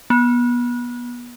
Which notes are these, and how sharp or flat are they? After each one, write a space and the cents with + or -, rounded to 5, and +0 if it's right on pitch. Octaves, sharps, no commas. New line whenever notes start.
B3 -30